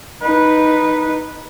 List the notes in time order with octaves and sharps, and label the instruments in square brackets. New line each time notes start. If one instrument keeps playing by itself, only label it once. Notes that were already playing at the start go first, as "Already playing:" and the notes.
[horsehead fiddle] D#4 B4